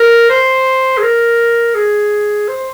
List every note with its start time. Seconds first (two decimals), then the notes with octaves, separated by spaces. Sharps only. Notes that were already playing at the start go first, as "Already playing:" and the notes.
Already playing: A#4
0.30 C5
0.97 G#4
1.02 A#4
1.74 G#4
2.48 C5